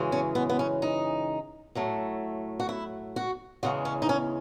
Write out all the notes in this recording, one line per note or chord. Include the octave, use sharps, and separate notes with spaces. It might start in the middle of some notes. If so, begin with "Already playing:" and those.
Already playing: F#2 C#3 E3 G#3
C#4
B3
B3
C#4
D#4
A2 F#3 A3
F#4
E4
F#4
E2 C#3 E3 G#3 F#4
C#4
D#4
C#4